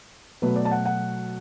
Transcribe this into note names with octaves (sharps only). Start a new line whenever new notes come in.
B2 F#3 A3 B4
D5
A5
F#5
F#5